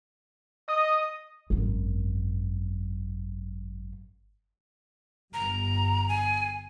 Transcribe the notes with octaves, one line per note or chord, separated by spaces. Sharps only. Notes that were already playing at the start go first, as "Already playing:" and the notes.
D#5 D#6
G#1 F#2
G1 G2 A#5
G#5